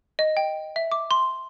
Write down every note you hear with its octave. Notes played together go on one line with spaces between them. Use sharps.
D#5
G5
E5
D6
C6